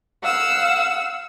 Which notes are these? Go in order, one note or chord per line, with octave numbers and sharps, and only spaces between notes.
F5 F#5 E6